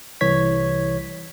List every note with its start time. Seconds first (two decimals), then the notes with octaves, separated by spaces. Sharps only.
0.21 C2 E3 C#5 G#6 B6